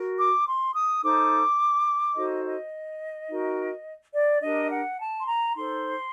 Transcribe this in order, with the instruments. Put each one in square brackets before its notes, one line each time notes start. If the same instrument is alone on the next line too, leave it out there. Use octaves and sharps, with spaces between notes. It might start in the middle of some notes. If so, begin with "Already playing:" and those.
Already playing: [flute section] F#4 A#4
D6
C6
D#6
D#4 A4 C5 D6
D#4 F#4 A4 C5 D#5
D#5
D#4 F#4 A#4
D5
D4 G4 A#4 D#5
F#5
A5
C6
A#5
D#4 A4 C5 C6